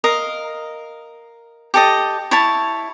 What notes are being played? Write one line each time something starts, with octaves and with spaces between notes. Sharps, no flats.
A#4 D#5 F5
G4 A4 D#5
E4 C#5 A5